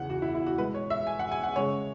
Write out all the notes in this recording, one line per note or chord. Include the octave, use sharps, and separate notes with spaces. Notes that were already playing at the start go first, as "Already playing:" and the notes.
Already playing: E2 C#3 E3 F#5
F#4
E4
E4
F#4
B2 G#3 B3 B4
C#5
E5
G#5
F#5
G#5
F#5
C#3 G#3 C#4 C#5